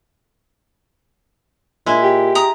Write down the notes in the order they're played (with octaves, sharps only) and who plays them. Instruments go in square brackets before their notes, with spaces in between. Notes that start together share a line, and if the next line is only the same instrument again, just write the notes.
[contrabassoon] A#2 [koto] G#3 E4
[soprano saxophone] G4
[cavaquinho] A#5 D#6